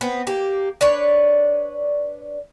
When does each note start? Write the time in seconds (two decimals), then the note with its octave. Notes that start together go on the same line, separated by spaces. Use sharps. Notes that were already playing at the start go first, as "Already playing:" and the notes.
0.01 B3 C4
0.27 A#3 G4
0.81 D4 B4 C#5